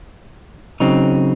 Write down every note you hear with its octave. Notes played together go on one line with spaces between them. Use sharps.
C#3 F#3 C4 D#4